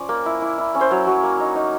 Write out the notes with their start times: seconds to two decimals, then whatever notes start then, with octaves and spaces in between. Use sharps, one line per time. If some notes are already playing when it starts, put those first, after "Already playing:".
Already playing: F3 C#4 F4 D5
0.09 A#3
0.26 E4
0.42 E4
0.58 E4
0.75 C#4
0.81 C5
0.91 F#3 C#5
1.07 F#3
1.23 A#3
1.40 D#4
1.55 D#4